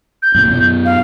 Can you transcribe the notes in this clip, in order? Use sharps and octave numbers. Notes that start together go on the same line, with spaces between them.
G6
F#2 A#2 C#3
F#2 B2
F5